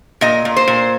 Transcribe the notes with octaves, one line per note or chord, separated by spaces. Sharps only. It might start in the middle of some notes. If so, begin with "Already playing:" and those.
A#2 D#5
A#2
C5
A#2